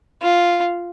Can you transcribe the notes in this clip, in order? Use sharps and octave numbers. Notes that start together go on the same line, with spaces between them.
F4